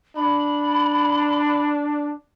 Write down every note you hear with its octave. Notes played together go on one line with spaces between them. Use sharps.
D4 B5